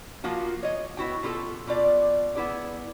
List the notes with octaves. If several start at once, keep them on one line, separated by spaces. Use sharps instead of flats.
F3 A#3 F4 F#4
C#5 D#5
B3 E4 F#4 G5
B2 F4 G4 A4
B2 F4 D5
B3 E4 G#4 D5